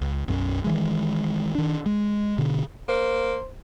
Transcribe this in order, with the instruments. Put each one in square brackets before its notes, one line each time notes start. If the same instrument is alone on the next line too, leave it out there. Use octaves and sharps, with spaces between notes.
[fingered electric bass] C#2
B1 F#2 C4 C#4
D#3 E3 G#3
D#3 D4
G#3
B2 D3
[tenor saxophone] A#3 [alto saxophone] C5